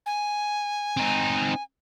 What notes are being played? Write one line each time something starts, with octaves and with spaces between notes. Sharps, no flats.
G#5
C4 D#4